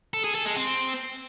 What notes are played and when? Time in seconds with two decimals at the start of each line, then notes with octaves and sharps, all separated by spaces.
0.14 A4
0.24 G#4
0.35 A4
0.45 G#3
0.56 C4